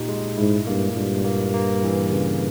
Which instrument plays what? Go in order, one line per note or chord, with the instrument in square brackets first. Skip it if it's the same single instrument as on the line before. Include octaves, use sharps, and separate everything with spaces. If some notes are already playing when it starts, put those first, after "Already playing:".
Already playing: [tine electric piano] A#2 D#4 G4
G#3
[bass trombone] G#2 [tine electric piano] E4
[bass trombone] G2 [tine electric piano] A#3
[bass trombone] G2 [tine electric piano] A#2
[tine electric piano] A#3
A#3
E3
C#3